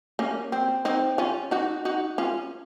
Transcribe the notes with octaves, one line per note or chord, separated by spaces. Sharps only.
A#3 C#4
C4
C4 D#4
C#4 F4
D#4 F#4
D#4 F#4
C#4 F4